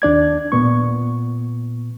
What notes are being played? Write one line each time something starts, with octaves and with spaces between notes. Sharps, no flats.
D#2 D4 D5 G#6
A#2 B3 C#6